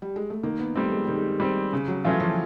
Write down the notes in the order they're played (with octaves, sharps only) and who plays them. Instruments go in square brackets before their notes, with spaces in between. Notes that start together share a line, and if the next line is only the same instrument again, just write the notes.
[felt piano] G3
G#3
A3
[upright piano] D#3 [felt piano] A#3
[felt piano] B3
[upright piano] G3 C4 [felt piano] A3
[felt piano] G#3
[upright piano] D#3 [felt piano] G3
[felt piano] G#3
[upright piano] G3 C4
C#3
[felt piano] F#3
[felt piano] E3 [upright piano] F#3 A3 C#4 F4
[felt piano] F3